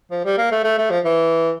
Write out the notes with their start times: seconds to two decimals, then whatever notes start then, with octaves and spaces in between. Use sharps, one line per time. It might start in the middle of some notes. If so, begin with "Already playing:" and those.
0.11 F3
0.25 G3
0.38 A#3
0.52 A3
0.64 A3
0.78 A3
0.90 F3
1.05 E3